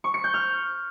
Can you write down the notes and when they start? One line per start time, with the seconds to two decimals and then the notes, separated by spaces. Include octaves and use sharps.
0.04 C#6
0.14 C#7
0.24 G6
0.34 F6